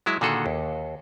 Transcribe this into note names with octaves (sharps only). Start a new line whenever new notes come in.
F#3 G#3 E4
A#2 D3 D#3 F#4 G#4 A4
D#2